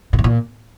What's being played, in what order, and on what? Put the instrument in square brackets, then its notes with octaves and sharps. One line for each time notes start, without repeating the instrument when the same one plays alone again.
[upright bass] A#2
A2
A#2